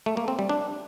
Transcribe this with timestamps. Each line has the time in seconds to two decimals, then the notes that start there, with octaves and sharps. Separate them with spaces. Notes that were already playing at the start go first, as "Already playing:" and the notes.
0.06 A3
0.17 A#3
0.28 C4
0.39 G3
0.49 D4